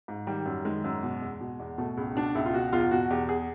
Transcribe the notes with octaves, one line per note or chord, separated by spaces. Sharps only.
G#2
D#3 G3
F#2
D#3 G#3
F#2
B2
E2
B2
E2
B2 A3
C#2
B2 D4
C#2 E4
F4
B2 F#4
E2 F4
B2 F#4
E2 G4
G#4